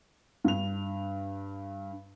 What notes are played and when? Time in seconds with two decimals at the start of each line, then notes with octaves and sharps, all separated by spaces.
0.44 G2 F7